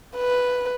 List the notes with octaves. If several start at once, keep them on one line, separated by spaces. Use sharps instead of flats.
B4